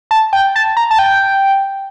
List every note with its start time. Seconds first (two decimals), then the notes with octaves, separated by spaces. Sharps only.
0.11 A5
0.33 G5
0.56 A5
0.77 A#5
0.91 A5
0.99 G5